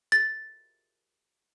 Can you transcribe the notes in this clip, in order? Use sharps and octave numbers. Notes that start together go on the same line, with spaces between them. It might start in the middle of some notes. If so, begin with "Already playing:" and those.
A6